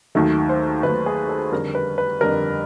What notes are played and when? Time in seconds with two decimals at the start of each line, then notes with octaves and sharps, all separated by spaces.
0.15 D#2 D#3 F#3 A3
0.49 C5
0.83 D#2 D#3 F#3 A3 B4
1.06 G#4
1.29 A4
1.52 F2 D3 G3 A#4
1.75 B4
1.98 B4
2.21 F2 D3 G3 A#4